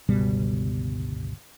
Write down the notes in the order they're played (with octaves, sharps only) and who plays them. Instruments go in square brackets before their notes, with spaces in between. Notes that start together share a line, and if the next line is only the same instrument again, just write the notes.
[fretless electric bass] G1 C#2 B2 G3